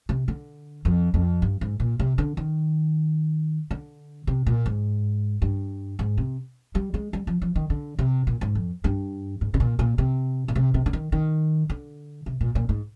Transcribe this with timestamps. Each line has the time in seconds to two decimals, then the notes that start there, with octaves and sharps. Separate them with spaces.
0.09 C3
0.28 D3
0.85 F2
1.14 F2
1.42 G2
1.61 G#2
1.80 A#2
1.99 C3
2.18 D3
2.37 D#3
3.71 D3
4.27 C3
4.46 A#2
4.66 G#2
5.42 G2
5.99 G#2
6.18 C3
6.75 G3
6.94 G#3
7.13 G3
7.27 F3
7.42 F3
7.56 D#3
7.70 D3
7.99 C3
8.27 A#2
8.41 G#2
8.55 F2
8.84 G2
9.41 G#2
9.54 C3
9.60 A#2
9.79 A#2
9.98 C3
10.48 A#2
10.55 C3
10.74 C3
10.86 D3
10.93 D#3
11.12 D#3
11.70 D3
12.26 C3
12.41 A#2
12.55 A#2
12.69 G#2